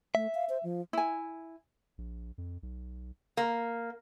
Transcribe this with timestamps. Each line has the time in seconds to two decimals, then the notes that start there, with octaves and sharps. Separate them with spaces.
0.15 A3 E5
0.35 F5
0.49 C5
0.63 F3
0.93 E4 G#5
1.98 A#1
2.38 F2
2.63 B1
3.37 A#3